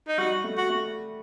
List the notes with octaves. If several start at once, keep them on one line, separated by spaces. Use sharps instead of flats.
D#4
G3 F#4
A3
F#4
A3